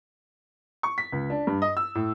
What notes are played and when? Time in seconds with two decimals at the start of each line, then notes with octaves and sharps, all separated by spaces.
0.83 C#6
0.98 B6
1.12 C#2
1.30 D4
1.47 G2
1.62 D#5
1.77 E6
1.95 A2